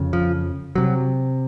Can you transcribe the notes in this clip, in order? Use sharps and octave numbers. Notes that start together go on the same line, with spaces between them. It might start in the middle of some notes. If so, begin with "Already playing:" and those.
Already playing: F2 C#3
F3
C3 F#3